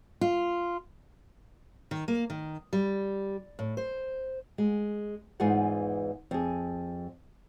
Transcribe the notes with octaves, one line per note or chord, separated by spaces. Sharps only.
F4
D#3
A#3
D#3
G3
A2
C5
G#3
E2 G#2 E3 F4 G#4 F#5
F2 G#4